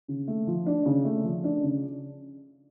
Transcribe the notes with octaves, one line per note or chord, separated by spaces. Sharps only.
C#3
A3
F3
D4
C#3
A3
F3
D4
C#3